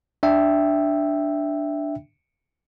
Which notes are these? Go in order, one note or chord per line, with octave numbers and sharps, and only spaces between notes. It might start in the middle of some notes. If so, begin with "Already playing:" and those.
D4 E5 G5